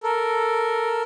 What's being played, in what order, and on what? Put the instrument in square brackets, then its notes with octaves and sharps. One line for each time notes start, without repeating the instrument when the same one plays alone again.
[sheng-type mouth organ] A4 A#4